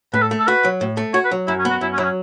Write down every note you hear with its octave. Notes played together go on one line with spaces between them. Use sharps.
A2 B4
A4
A3
A4
F#4 B4
F#3
A2
A3
F#4 C#5
B4
F#3
F#2 E4
C#4
B3 F#4
F#2 E4
C#4
F#3 E4
C#4